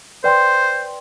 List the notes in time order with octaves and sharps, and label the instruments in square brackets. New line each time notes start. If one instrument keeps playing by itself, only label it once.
[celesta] B4 D5 G5 C6 [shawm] C5